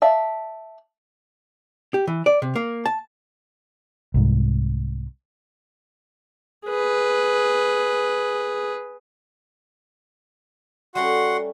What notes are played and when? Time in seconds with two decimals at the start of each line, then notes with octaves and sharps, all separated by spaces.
0.02 D5 E5 F5 A5
1.94 G4
2.07 E3
2.26 D5
2.42 C3
2.56 A#3
2.86 A5
4.14 C2 G#2
6.66 G#4 B4
10.95 G3 A3 C#4 F#4 F#5 C6